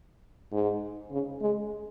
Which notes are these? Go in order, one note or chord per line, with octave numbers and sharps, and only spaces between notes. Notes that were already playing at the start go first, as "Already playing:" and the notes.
G#2
C#3
G#3